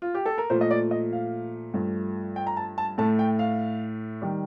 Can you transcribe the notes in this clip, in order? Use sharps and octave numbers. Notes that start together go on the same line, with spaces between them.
F4
G4
A4
A#4
A#2 F3 A3 C5
D#5
D5
D#5
F5
G2 F3 A3
G5
A#5
A5
A5
A2 A3 A5
G5
F5
D#3 G3